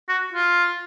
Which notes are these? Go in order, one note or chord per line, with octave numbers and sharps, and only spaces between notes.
F#4
F4